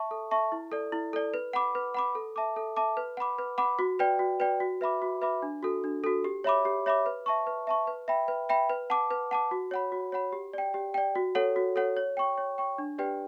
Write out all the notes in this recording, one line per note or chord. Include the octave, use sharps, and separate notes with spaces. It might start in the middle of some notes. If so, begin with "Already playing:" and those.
Already playing: E5 A5 C#6
A4
E5 A5 C#6
E4
A4 D5
E4
A4 D5
B4
F#5 B5 D6
B4
F#5 B5 D6
A4
E5 A5 D6
A4
E5 A5 D6
B4
F#5 B5 D6
B4
F#5 B5 D6
F#4
B4 D5 G5
F#4
B4 D5 G5
F#4
B4 E5 B5 D6
F#4
B4 E5 B5 D6
D4
F#4 A4
D4
F#4 A4
G4
C#5 E5 B5 D6
G4
C#5 E5 B5 D6
B4
E5 A5 C#6
B4
E5 A5 C#6
B4
E5 G5 B5
B4
E5 G5 B5
B4
F#5 A5 D6
B4
F#5 A5 D6
F#4
C#5 F#5 B5
F#4
C#5 F#5 B5
G4
D5 G5
G4
D5 G5
F#4
A4 C#5 F#5
F#4
A4 C#5 F#5
C#5
G5 C#6
C#5
G5 C#6
D4
G4 B4 D5 G5